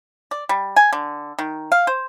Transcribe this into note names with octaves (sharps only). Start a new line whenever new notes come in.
D5
G3
G#5
D3
D#3
F5
C5